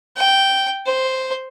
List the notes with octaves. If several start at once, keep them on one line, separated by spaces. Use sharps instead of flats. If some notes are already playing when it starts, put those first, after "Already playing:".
G5
C5